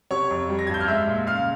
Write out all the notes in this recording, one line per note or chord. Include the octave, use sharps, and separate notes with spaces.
C3 C#5 C#6
F2
G3
A#6
G2 G#6
G6
F6
G#3 E5 E6
A#2
C#3 F5 F6